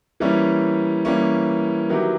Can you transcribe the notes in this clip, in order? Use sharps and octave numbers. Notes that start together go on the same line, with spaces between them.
E3 G3 A#3 C#4 E4
E3 G3 A#3 C#4 E4
D#3 F#3 B3 E4 G4